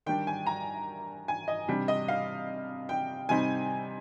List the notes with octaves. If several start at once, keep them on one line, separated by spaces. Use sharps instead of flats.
D#3 G3 D4 G5
G#5
A#5
G#5
D#5
C3 G3 D4
D#5
F5
G5
C3 G3 C4 D#4 G#5